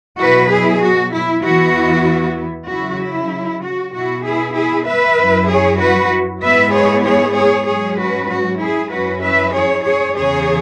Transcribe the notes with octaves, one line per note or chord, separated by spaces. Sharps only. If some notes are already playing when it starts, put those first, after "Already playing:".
B2 F#3 E4 F#4 B4
E4 G#4
F#4
E4
E2 E3 B3 E4 F#4
C#3 F#3 E4 F#4
E4
F#4
B2 B3 E4 F#4
E4 G#4
E4 G#4
B4 E5
F#2 F#3 E4
G#4 C#5
F#4 B4
G#2 G#3 B3 E4 B4 E5
G#4 C#5
G#4 C#5
G#4 C#5
G#2 F#3 C#4 G#4 C#5
F#4 B4
F#4
E4 G#4
F#2 F#3 C#4 E4 F#4 B4
B4 E5
G#4 C#5
G#4 C#5
E2 C#3 E3 G#4 C#5